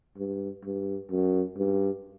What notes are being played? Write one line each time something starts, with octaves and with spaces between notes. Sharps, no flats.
G2
G2
F#2
G2